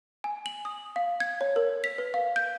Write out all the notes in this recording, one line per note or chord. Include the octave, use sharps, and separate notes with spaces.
G#5
F#7
D#6
F5
G#6
C#5
A#4
B6
B4
F5
G6